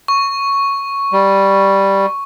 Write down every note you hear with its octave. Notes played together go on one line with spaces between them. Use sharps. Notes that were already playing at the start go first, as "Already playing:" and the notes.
C#6
G3